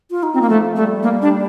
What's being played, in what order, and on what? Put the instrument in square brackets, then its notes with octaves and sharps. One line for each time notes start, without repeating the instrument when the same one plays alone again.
[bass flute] F4
D#4
[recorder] C4
A#3
[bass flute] F3 [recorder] A3
[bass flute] G3 [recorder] A3
[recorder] A#3
D4